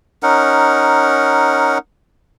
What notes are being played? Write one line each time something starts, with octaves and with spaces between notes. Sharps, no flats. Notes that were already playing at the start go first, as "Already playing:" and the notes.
C#4 D#4 A#4 F#5